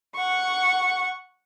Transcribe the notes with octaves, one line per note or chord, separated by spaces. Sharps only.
F#5 C#6